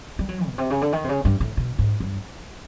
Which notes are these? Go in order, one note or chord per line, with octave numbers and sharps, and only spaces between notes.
G3
F#3
B2
C3
C#3
D3
D#3
C3
C#3
G2
A2
B2
G#2
G2